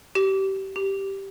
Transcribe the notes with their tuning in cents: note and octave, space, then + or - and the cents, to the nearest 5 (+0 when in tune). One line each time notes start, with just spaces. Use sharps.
G4 -25
G4 -5